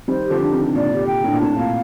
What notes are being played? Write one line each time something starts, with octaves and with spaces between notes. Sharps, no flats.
D#3 G3 C5
G4
D3 F3
D4
C3 D#3
D4
C3
A#2 D5
G4
G5
A2 D4
A#2
A2 C3 A5
A#2 F5